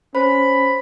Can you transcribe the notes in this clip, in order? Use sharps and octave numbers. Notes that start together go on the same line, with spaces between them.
C#4 C5 B5